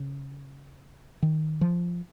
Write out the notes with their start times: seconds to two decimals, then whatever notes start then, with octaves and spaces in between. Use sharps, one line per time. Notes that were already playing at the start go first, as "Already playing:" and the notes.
Already playing: C#3
1.22 D#3
1.61 F3